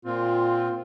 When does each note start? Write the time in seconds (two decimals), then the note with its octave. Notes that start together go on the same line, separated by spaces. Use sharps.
0.05 A#2 C4 F4